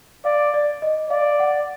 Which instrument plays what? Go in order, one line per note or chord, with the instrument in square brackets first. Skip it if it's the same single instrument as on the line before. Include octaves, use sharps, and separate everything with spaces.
[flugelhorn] D5 [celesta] F5
[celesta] D5
D#5
[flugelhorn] D5 [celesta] F5
[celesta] F#5